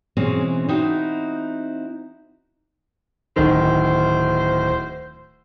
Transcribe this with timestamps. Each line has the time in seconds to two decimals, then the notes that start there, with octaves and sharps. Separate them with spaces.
0.17 B2 E3 G#3 C4 C#4
0.68 C4 D#4 E4 F#4
3.36 D1 D#3 C5